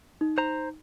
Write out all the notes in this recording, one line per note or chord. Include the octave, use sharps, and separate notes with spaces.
D#4
C5 A#5